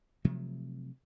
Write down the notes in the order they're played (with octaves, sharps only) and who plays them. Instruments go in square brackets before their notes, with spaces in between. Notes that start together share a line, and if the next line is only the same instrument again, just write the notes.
[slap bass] C3 F3 F#3 A3